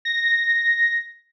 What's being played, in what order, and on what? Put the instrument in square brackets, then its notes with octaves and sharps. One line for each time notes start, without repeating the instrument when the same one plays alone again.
[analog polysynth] A#6